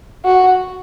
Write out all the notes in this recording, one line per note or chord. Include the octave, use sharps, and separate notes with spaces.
F#4